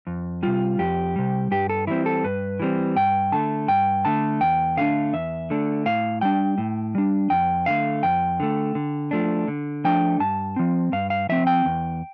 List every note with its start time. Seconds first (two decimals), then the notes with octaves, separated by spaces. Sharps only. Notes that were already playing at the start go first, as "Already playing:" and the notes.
0.07 F2
0.43 C3 G3 F4
0.79 F2 G4
1.16 C3 G3
1.51 G2 G4
1.69 A4
1.87 E3 G3 C4 E4
2.06 A4
2.24 G2 B4
2.60 E3 G3 C4
2.96 G2 G5
3.32 D3 A3 A5
3.68 G2 G5
4.05 D3 A3 A5
4.41 E2 G5
4.77 D3 A3 D4 F5
5.13 E2 E5
5.50 D3 A3 D4
5.86 A2 F5
6.21 G3 D4 G5
6.58 A2
6.95 G3 D4
7.30 F2 G5
7.66 D3 A3 F5
8.03 F2 G5
8.40 D3 A3
8.75 D3
9.11 F3 A3 D4
9.48 D3
9.84 F3 A3 D4 G5
10.20 G2 A5
10.56 F3 C4
10.92 G2 F5
11.10 F5
11.29 F3 C4 E5
11.47 G5
11.65 E2